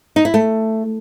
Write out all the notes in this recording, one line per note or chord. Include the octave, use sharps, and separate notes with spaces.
D#4
E4
A3